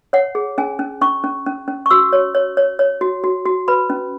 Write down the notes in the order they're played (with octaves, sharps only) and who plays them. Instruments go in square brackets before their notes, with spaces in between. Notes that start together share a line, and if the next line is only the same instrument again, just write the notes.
[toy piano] C#5 F#5
G#4
C#4 G#5
C#4
C#4 C#6
C#4
C#4
C#4
C#6
F#4 E6
C#5
C#5
C#5
C#5
F#4
F#4
F#4
B4 B5
C#4